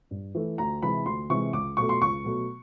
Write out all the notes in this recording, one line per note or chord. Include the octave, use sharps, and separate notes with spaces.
G2
E3 A3
D2 A#5
C3 E3 G#3 B5
D2 C6
C3 E3 G#3 C#6
C#2 D6
B2 F#3 A3 C#6
C6
C#2 C#6
B2 F#3 A3